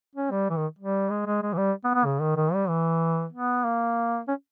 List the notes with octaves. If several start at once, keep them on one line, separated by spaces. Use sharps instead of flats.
C#4
G3
E3
D#3
G3
G#3
G#3
G#3
E3
G3
B3
B3
C#3
D#3
D#3
G3
E3
B3
A#3
C#4